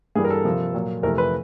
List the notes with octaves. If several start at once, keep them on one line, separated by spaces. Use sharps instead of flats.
G2 E3 G3 A#3 G#4
A#4
A4
C3 F3 A#3
A#2 F#3 A#3
F2 C3 E3 A3 A#4
B4